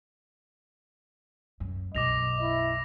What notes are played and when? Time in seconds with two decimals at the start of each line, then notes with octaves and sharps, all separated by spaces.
1.60 F#2
1.95 B1 F#2 D#5 D6 A#6 F7
2.41 E4